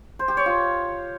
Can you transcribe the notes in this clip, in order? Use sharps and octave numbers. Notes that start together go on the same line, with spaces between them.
C5
G4
C#5
F4